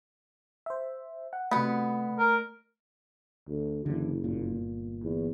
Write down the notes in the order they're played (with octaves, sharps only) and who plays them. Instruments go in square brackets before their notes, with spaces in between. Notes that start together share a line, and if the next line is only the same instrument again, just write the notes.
[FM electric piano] C5 E5
F#5
[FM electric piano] C3 F#4 B5 [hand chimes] A3 [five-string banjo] B3 F#5
[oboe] A#4
[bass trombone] D2
[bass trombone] F#1 [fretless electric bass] D3 E3
[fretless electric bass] G1 A#2
[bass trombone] E2